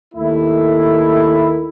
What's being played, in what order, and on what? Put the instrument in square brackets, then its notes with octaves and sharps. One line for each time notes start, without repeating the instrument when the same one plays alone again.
[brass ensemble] D#2 D#3 A3 E4